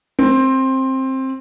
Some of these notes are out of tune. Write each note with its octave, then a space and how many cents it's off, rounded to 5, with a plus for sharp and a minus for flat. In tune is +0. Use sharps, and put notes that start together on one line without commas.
C4 +15